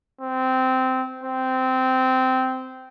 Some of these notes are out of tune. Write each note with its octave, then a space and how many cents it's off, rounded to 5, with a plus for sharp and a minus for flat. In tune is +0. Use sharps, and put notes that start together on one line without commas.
C4 -15
C4 -15